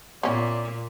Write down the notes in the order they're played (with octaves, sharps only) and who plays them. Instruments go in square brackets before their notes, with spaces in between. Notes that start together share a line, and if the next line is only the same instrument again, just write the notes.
[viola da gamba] A#2 [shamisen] B3 C#4 E4 [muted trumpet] D5